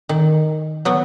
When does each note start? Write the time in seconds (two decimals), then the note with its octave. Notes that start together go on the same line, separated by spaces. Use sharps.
0.09 D#3
0.85 F#3 B3